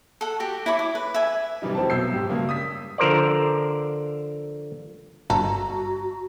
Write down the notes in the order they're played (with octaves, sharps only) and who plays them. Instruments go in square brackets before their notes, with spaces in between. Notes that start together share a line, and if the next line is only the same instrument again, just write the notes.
[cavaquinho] A4 F#5
F#4 G4
E4 C#5 B5 D6
D6
B4
E5 G#5
[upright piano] F#2 C3 E3 G3 D#4
F1 F#3 C4 C5 A5
B1 B2 F#3 E6 G6 C7
G#2 G4
G2 C#3 A#3
D#6 E6 B6
[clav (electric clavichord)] D3 F3 A#4 C5 D5
[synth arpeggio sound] G1 [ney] F#4 [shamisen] A4 [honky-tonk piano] A#5